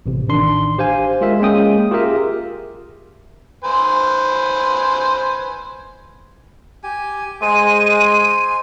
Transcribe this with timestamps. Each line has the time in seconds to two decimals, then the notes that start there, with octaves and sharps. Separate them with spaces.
0.06 A1 C3
0.28 A1 D#3 D4 C6
0.78 G4 C5 F5 G#5
1.21 G#3 F4 A#4 E5
1.40 G#3 A#3 C#4 G5 D#6
1.91 F4 G4 G#4 A#4 E5
3.64 B4 C5 G#5
6.84 G4 G#5
7.42 G#3 C5 G#5 D#7